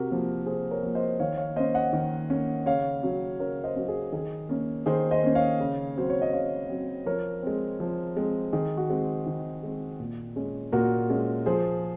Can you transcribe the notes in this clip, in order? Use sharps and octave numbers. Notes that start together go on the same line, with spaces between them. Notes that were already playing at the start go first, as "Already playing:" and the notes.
Already playing: C3 F#4 A#4
F3 A#3
C3 G#4 C5
A#4 C#5
F3 A#3
C5 D#5
D#3 C#5 F5
C#5 F5
A#3 C#4 C5 D#5
D#5 F#5
D#3
A#3 C#4
C#3 C#5 F5
F#3 C#4
C#3 A#4 C#5
C5 D#5
F#3 C#4
G#4
D#3 G#4
A#3 C#4
D#3 G#4 C5
C5 D#5
A#3 C#4
C#5 F5
C#3
F#3 C4 C5
C#5
D#5
C#3 C#5 F5
F#3 C4
F3 A#4 C#5
G#3 C4
F3
G#3 C4
D#3 G#4
F#4
G#3 C4
D#3
G#3 C4
A#2
G#3 C#4
A#2 F#4 A#4
G#3 C#4
F3 G#4 C5